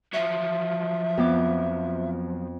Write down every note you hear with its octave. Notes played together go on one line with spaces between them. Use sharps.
F3 F#3 E5
F2 B3 D6